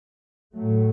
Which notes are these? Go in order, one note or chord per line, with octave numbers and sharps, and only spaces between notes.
A2 F#3 A3